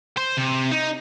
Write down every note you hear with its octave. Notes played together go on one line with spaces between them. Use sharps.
C5
C3
D#4